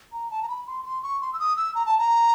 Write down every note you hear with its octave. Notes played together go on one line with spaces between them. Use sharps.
A#5
A5
A#5
B5
C6
C6
C#6
C6
E6
D#6
E6
A#5
A5
A#5